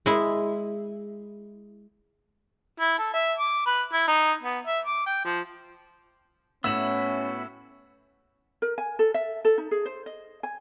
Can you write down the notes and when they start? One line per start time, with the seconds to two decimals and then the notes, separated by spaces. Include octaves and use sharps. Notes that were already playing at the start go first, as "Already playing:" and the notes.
0.06 G#3 E4
2.80 E4
2.98 A4
3.13 E5
3.38 D6
3.66 B4
3.93 E4
4.07 D#4
4.43 B3
4.67 E5
4.85 D6
5.06 G5
5.25 F3
6.64 A2 B3 C#4 E4 F#4 E6 E7 F#7
8.62 A#4
8.78 G#5
8.99 A4
9.14 E5
9.45 A4
9.58 D#4
9.71 G#4
9.86 C5
10.06 D#5
10.43 G#5